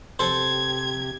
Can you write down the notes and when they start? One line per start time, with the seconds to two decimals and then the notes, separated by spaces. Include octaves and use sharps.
0.19 C3 G4 A4 C5 G#6